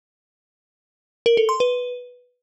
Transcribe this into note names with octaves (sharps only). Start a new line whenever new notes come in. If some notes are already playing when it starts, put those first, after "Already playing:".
A#4
A4
C6
B4